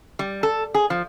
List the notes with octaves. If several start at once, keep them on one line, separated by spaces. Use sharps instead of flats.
G3
A4
G#4
F3